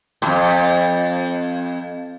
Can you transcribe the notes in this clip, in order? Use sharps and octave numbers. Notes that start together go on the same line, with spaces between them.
F2 A2